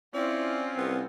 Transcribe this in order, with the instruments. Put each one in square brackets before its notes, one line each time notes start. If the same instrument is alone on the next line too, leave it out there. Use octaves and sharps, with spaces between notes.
[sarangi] C4 [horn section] C#4 F4 [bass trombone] E4 [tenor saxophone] D5
[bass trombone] C2 [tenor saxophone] B3